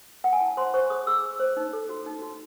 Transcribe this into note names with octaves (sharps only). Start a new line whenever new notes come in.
F#5
G#5
E4 A5
C5 C6
C5 C#6
G#4 D#6
G#4 E6
G#4
C5
D#4
A4
F#4
D#4
F#4